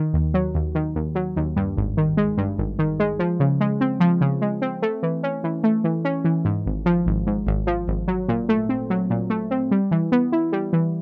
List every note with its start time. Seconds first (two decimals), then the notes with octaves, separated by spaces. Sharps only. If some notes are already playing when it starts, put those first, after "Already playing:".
Already playing: D#3
0.13 D#2
0.34 F#3
0.55 D#2
0.75 D#3
0.95 D#2
1.15 F#3
1.36 D#2
1.56 G2
1.77 G#1
1.97 D#3
2.17 G#3
2.38 G2
2.58 G#1
2.79 D#3
2.99 G#3
3.19 F3
3.40 C#3
3.60 G#3
3.81 C4
4.00 F3
4.21 C#3
4.41 G#3
4.62 C4
4.82 A3
5.03 E3
5.23 C#4
5.44 E3
5.64 A3
5.84 E3
6.05 C#4
6.24 E3
6.45 G#2
6.66 G#1
6.86 F3
7.06 G#1
7.27 G#2
7.47 G#1
7.67 F3
7.88 G#1
8.08 F#3
8.28 A#2
8.49 A3
8.69 C4
8.90 F#3
9.10 A#2
9.30 A3
9.51 C4
9.71 G3
9.91 E3
10.12 B3
10.32 E4
10.52 G3
10.73 E3